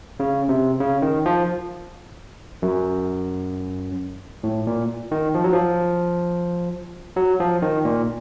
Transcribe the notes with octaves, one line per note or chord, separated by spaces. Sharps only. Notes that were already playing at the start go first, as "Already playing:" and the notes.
C#3
C3
C#3
D#3
F3
F#2
A2
A#2
D#3
F3
F#3
F3
F#3
F3
D#3
A#2